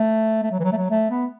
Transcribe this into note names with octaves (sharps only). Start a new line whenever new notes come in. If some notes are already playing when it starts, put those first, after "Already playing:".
Already playing: A3
A3
F#3
E3
F#3
A3
F#3
A3
B3